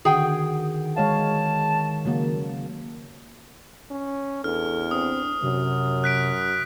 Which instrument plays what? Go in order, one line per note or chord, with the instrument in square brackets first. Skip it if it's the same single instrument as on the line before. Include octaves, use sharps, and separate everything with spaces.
[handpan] D3 F#4 [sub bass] D#3 [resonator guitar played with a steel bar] G#4 G5
[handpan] G#3 C#5 F5 [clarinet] A5
[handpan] C#3 F#3 A#3
[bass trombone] C#4
[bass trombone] E2 [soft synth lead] D4 [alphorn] A4 [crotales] F6
[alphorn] C4 [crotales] D#6
[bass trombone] F#2 [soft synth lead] C3 [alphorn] F#3
[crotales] F#6 B6 D7